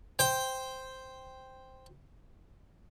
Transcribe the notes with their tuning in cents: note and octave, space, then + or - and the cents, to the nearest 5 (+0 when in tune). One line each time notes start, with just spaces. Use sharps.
C5 +0 G5 +0